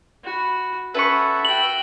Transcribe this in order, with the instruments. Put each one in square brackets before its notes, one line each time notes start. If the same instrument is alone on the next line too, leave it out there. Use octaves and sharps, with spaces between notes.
[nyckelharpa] F#4 B5
[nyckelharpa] C#4 F#5 [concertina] A4 E5 [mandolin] B4 B5 C#6
[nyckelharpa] F#4 G5 [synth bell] F#7